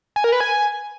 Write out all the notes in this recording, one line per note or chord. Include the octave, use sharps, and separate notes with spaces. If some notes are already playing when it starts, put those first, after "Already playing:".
G#5
A#4
B4
G#5